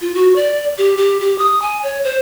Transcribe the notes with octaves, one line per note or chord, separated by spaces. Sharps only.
F4
F#4
D5
G4
G4
G4
D#6
G#5
C#5
C5